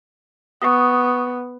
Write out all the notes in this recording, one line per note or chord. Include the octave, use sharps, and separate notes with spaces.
B3 C#6 D#6